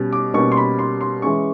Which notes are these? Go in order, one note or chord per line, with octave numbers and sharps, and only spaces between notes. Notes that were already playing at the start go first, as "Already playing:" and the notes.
Already playing: B2 G3 C#4
D6
B2 G3 A#3 C#4 C#6
C6
B5
C6
C6
E3 G#3 C#4 C#6